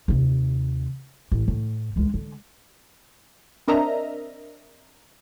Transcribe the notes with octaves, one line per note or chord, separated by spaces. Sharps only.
D#2 C3
A1
A2
D2 G#3
D3
C4 D4 A#4 D#5 E5 A#5